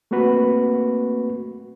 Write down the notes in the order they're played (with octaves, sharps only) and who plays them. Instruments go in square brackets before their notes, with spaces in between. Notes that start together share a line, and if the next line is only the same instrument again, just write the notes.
[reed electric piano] A3 A#3 C4 F#4 B4